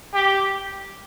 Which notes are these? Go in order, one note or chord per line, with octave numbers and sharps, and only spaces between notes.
G4